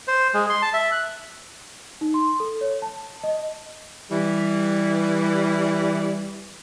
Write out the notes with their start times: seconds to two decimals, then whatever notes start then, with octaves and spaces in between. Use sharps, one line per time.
0.08 C5
0.34 G#3
0.50 C6
0.62 A5
0.74 E5
0.92 F#6
2.01 D#4
2.14 C6
2.40 A4
2.61 C#5
2.82 A5
3.23 D#5
4.10 E3 G3